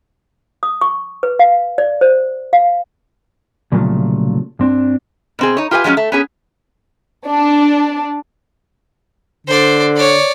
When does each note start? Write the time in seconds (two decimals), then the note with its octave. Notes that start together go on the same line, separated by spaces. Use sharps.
0.63 D#6
0.81 C#6
1.23 B4
1.39 F5
1.78 D5
2.01 C5
2.53 F5
3.72 C2 A#2 C#3 F3 F#3 A3
4.59 G2 C4 D4
5.39 B2 C4 G#4
5.57 D#4 C#5
5.71 F4 G4 B4 F#5 G#5
5.84 F3 F#3 G#3 B3 C#4
5.97 A3
6.12 B3 C#4 G#4
7.27 D4
9.47 D3 C5 D5
9.96 C#5 D5